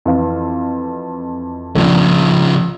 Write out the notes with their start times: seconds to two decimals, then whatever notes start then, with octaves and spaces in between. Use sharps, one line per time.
0.05 F2 E3 F5
1.75 A#1 C#3 F3 D4